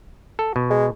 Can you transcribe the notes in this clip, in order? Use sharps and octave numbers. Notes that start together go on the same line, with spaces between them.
A4
B2
G#3